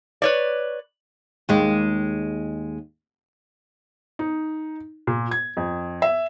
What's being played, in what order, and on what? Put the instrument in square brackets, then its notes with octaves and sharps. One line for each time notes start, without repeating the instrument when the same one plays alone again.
[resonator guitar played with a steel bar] B4 C#5 D5
[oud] D#2 G#3
[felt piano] D#4
A#2
G#6
F2
E5